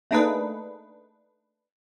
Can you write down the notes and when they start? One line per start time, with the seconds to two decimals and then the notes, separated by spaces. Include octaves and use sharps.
0.11 A3 A#3 D4 D#4 G#4 B4